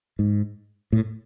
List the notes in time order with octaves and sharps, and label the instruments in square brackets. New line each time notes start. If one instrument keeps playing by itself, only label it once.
[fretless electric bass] G#2
A2